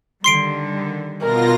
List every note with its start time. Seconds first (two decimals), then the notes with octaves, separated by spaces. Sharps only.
0.24 D3 D#3 G3 C6 C7 D7
1.22 B2 F4 A#4 A#6